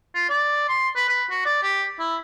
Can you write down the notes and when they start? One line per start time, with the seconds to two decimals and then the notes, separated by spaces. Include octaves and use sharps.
0.15 F4
0.30 D5
0.69 C6
0.96 B4
1.09 B4
1.30 F#4
1.46 D5
1.63 G4
1.99 E4